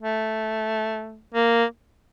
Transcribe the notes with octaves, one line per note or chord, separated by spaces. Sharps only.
A3
A#3